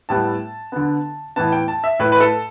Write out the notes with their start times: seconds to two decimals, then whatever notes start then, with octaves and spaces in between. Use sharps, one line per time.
0.09 A2 G3 B3 A5
0.72 D3 B3
1.36 A2 E3 B3 A5
1.52 G5
1.68 A5
1.84 E5
1.99 A2 A3 B4
2.12 B4
2.20 A4